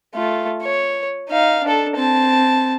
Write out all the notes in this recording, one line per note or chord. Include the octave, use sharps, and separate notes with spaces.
A3 F4
C#5
D#4 F5
D4 A4
C4 A5